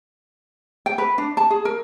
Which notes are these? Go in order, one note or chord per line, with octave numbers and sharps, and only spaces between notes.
G5
B4
D4
A5
G#4
A#4